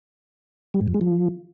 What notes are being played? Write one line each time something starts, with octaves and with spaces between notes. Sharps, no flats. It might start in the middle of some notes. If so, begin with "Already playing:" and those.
G3
G#2
F2
G#3
F3